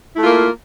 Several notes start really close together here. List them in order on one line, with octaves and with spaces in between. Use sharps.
E4 A3 F4 A#3